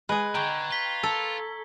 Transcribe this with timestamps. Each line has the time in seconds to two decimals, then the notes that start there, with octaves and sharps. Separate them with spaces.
0.09 G#3 G#4 B4
0.35 D3 G5 A#5 C#6 G#6
0.71 F4 B6 F#7 G7
1.03 A4